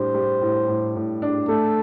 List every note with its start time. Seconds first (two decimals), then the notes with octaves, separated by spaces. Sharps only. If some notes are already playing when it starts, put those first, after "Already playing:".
Already playing: A2 G3 D4 C5
0.14 G3
0.41 A2
0.68 A2
0.96 A2
1.22 D4
1.48 A3 A4